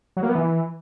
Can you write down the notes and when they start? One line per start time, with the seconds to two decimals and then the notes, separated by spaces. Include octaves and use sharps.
0.17 F#3
0.23 A#3
0.29 B3
0.35 E3